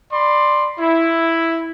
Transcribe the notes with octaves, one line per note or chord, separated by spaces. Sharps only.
D5 B5 C6
E4